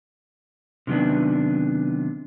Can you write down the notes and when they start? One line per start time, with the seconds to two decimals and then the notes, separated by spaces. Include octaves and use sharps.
0.87 C3 D#3 F#3 B3 D4